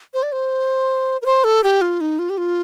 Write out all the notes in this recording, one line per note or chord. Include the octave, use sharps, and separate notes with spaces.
C5
D5
C5
A#4
C5
A4
G4
F4
D#4
F4
G4
F4